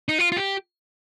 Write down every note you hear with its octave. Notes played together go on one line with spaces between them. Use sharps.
D#4
F4
F4
G4